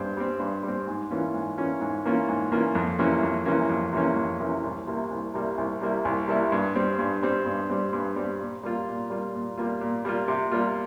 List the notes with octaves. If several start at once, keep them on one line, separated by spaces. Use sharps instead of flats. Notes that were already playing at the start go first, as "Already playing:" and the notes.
Already playing: G2 G3 C4
G3 C4
G2
G3
C4
G#2
E3 A#3 C#4 F4
G#2
E3 A#3 C#4 F4
G#2
E3 A#3 C#4 F4
G#2
E3 A#3 C#4 F4
F2
C3 E3 A#3 C#4
F2
C3 E3 A#3 C#4
F2
C3 E3 A#3 C#4
F2
C3 E3 A#3 C#4
C2
C3 G3 A#3 E4
C2
C3 G3 A#3 E4
C2
C3 G3 A#3 E4
C2
C3 G3 A#3 E4
G2
G3 C4
G2
G3 C4
G2
G3 C4
G2
G3 C4
A#2
G3 A#3 F4
A#2
G3 A#3 F4
A#2
G3 A#3 F4
A#2
G3 A#3 F4
C3
G3 A#3 F4